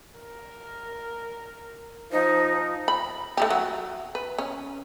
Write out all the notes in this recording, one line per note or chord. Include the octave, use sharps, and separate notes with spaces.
A#4
F3 D#4 C5
B5
A3 E4 G4
F#3
B4
C#4